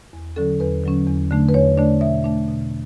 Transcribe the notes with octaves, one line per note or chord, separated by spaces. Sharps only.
E2
D3 F#3 C#4 A4
E2 B4
D3 F#3 C#4
E2
D3 A3 D4
B4
E2 C#5
D3 A3 D4 D5
B2 E5
A3 D4
B2